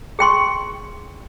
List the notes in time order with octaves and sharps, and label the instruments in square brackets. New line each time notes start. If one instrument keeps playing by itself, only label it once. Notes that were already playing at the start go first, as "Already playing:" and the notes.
[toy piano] G#4 G5 C6 C#6